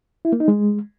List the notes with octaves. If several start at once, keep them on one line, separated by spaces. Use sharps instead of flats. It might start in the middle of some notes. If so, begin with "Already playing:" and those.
E4
A#3
D#4
G#3